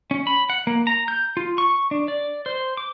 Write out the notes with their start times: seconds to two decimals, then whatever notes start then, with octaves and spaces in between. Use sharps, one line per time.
0.11 C#4
0.27 B5
0.50 F#5
0.67 A#3
0.87 A#5
1.08 G6
1.37 F4
1.58 C#6
1.91 D4
2.08 D5
2.46 C5
2.77 D6